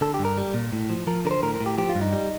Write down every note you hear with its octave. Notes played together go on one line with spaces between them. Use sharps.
D3 A4
G4
G2
A#4
G3
A#2
A2
F3
F3 A#4
D3 A#4
C5
A2 A#4
A#4
A2
G4
F3 G4
F4
G2
D#4
G3